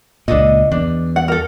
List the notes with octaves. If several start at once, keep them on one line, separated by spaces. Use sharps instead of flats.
C#2 A#2 D4 A4 D#5
E2 D4
F#5
A4 A#4